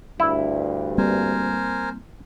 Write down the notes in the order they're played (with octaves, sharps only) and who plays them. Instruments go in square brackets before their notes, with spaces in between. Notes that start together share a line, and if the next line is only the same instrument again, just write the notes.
[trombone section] D2 G2 [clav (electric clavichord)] E4
[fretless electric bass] G3 A#3 C4 [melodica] A#4 C5 G#5